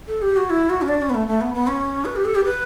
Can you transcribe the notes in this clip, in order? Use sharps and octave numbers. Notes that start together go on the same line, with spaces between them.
A4
G4
F#4
E4
F#4
C#4
D4
C#4
B3
A3
A3
B3
B3
C#4
B4
G4
A4
G4
B4